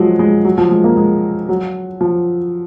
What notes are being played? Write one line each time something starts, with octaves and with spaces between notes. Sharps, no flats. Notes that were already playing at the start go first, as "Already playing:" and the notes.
Already playing: F3 F#3 G#3
G#3
F#3
F3
G#3
A#3
G#3
F#3
F3